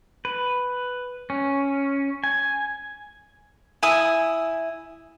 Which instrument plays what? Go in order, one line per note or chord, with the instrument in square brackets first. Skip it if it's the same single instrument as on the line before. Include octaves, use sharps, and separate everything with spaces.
[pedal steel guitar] B4
C#4
G#5
[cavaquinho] E4 G#5 D#6